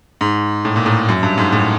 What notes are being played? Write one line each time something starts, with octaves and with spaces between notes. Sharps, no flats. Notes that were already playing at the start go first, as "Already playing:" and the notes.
G#2
A2
A#2
A2
F#2
G2
G#2
A2